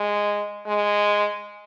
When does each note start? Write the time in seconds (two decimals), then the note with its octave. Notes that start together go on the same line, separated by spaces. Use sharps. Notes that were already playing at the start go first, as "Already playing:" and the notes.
Already playing: G#3
0.67 G#3